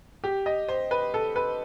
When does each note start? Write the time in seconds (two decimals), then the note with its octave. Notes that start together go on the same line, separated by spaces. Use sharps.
0.24 G4
0.46 D#5
0.68 C5
0.91 B4
1.14 A4
1.36 B4